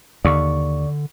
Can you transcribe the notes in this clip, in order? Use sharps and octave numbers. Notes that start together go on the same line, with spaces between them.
D#2 D3 D5 C#6